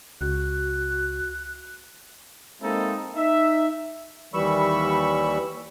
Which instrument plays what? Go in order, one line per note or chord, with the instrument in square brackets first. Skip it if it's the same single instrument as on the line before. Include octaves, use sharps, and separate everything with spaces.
[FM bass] C#2 [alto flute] F#4 [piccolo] F#6
[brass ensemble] G#3 A#3 C4 D#4 E4 A4
D#4 E5
[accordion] D#2 E3 G3 B5 C#6 E6